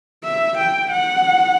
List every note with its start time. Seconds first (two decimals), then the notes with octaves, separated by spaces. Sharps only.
0.25 E5
0.58 G5
0.91 F#5